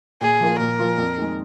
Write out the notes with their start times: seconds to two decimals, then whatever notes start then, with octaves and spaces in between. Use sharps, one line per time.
0.21 A#2 G#4
0.40 F3 A#3 F4
0.59 A#2 A#4
0.79 F3 A#3 F4
0.98 F2
1.18 D#3 G#3